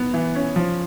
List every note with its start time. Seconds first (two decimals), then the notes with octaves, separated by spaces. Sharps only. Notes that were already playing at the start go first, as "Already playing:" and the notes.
Already playing: B3
0.14 E3
0.35 C#4
0.56 F3